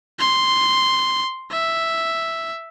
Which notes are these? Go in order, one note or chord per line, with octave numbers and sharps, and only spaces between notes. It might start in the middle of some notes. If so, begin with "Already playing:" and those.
C6
E5